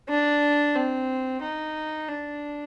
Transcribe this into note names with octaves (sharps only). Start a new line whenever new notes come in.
D4
C4
D#4
D4